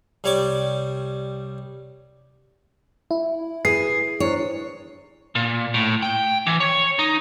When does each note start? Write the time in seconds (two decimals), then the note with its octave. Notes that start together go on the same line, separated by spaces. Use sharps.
0.24 C2 G3 C#5 D5 D6
3.11 E4
3.65 G#4 B4 C7
4.20 D4 E4 C5 C#5
5.35 A#2
5.74 A2
6.02 G5
6.47 E3
6.60 C#5
6.99 D#4